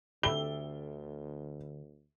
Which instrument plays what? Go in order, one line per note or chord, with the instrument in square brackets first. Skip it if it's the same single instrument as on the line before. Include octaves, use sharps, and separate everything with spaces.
[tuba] D2 [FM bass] D3 [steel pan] G4 A4 E5 [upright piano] G7